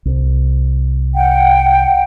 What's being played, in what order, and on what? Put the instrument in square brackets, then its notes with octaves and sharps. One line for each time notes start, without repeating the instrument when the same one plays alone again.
[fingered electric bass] C2
[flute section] F#5 G5